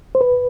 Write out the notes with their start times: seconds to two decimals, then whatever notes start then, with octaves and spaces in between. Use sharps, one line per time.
0.15 C5
0.21 B4